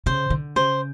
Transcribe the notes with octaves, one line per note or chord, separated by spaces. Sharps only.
C#3 C5
D3
C#3 C5